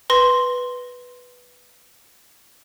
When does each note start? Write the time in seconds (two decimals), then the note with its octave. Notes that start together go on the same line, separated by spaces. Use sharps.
0.10 B4 C6 A#6